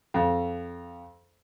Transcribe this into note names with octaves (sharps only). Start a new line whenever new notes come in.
F2